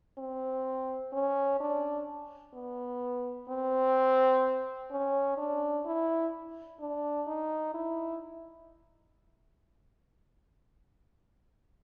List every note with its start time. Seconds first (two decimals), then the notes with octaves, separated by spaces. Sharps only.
0.18 C4
1.13 C#4
1.60 D4
2.54 B3
3.49 C4
4.91 C#4
5.38 D4
5.86 E4
6.80 D4
7.27 D#4
7.74 E4